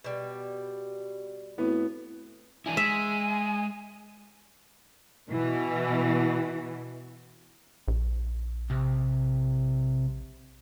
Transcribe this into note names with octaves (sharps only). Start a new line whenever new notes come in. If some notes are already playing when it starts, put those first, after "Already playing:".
B2 G3
A2 B3 C4 E4 F#4
E3 D4 E4 G#5
G#3 E5
B2 E3
A#1
C2